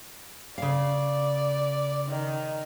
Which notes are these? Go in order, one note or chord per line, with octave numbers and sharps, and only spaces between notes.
C#3 D5 F5
D#3